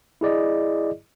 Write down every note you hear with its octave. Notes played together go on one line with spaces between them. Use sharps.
E4 G#4 D5 D#5